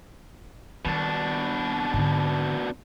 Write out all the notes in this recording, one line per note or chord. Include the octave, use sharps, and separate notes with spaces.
B2 D#3 G3 D4
G#2 D3